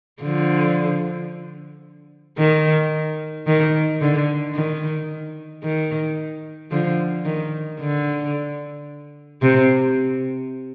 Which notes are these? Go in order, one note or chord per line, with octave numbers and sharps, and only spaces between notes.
D3 F3
D#3
D#3
D3
D#3
D#3
D3 F3
D#3
D3
C3